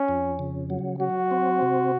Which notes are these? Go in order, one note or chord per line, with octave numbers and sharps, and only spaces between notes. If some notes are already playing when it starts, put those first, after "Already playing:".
Already playing: C#4
F2
C#3
F#3
F#3 F#4
C4
C3